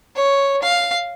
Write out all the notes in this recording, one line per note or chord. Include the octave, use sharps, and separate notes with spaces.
C#5
F5